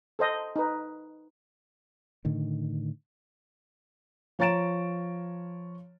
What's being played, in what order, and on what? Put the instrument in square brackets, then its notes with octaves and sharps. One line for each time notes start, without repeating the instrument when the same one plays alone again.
[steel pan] A4 C5 D#5
D#4 B4
[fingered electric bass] A2 D3 D#3
[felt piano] F3 C#5 A#5 A6 D7 E7